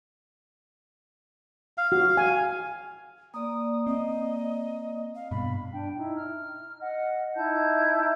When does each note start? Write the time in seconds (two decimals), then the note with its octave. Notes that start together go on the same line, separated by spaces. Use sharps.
1.78 F5
1.92 F#4
2.17 G#5
3.34 A#3 D5 D#6
3.87 C4 D#5
5.15 F5
5.31 G2 B2 B5
5.72 D4 G5
5.95 D#4 E4
6.15 F6
6.80 D#5 F#5
7.35 D#4 E4 A5 G6